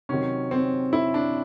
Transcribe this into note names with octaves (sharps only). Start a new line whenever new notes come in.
C3 D#3 F#3 C#4
C4
E4
D4